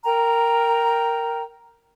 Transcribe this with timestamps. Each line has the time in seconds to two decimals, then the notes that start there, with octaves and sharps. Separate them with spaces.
0.04 A#4 G5 A#5